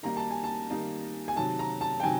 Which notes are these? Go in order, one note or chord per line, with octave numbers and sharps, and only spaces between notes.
D#3 G3 A#3 D#4 A#5
A5
G#5
A5
D#3 G3 A#3 D#4
G#5
C3 D#3 F#3 A5
A#5
A5
G5
C3 D#3 F#3 G#5